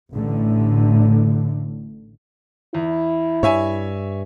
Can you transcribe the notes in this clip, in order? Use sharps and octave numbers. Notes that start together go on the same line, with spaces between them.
A1 A2 D3
E2 E4
G2 C#5 E5 G#5